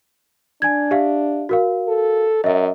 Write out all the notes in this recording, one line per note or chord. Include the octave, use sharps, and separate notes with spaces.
D4 G#5 G#6
G4 E5 F5
F#4 A#4 F5
A4
F#2 D#5 E5